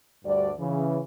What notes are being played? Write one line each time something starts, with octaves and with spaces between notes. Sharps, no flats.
D2 G2 G3 F#4 D5
C#3 E3